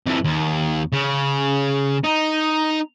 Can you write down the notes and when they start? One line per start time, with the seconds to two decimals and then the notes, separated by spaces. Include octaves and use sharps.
0.06 F2 E3
0.24 D#2
0.92 C#3
2.04 D#4